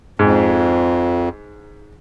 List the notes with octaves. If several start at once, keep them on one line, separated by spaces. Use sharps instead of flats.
F2 G#2